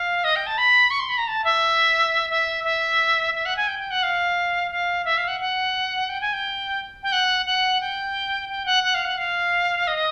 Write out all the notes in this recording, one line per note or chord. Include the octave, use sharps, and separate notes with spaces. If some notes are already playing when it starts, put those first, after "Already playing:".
Already playing: F5
D#5
G5
A5
B5
C#6
C6
B5
A#5
A5
E5
E5
E5
E5
F#5
G#5
G5
G5
F#5
F5
F5
E5
F5
F#5
F#5
G5
G#5
G5
G5
F#5
F#5
G5
G5
F#5
F#5
F5
F#5
F5
D#5